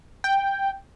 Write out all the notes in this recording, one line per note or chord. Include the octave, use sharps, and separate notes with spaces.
G5